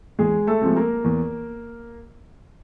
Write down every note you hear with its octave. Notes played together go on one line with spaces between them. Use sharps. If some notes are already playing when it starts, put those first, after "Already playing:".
E2 G#3 G#4
A3 A4
C3 F3 G#3
A#3 A#4
E2